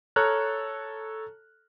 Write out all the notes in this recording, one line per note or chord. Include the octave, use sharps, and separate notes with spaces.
A4 C#5 A#5 F6 F#6